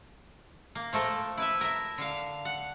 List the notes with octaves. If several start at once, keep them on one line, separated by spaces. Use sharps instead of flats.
A#3
F3 A3 A4 A#4
E4 B4 E5
A#4 E5
D3 F5
F#5